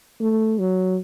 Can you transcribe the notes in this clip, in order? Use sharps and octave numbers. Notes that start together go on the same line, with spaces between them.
A3
F#3